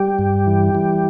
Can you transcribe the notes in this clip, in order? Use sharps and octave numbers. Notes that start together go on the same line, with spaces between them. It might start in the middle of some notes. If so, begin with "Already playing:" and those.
Already playing: G3 G4
G2
E3
E3